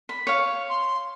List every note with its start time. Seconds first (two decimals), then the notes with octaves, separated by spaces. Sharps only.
0.09 B5
0.27 C#5 F5
0.69 C6